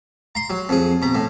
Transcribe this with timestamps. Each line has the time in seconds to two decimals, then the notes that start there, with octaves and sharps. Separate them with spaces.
0.35 A#5 C6
0.50 F#3
0.69 F2 G#4
1.02 B2 A#5
1.15 A2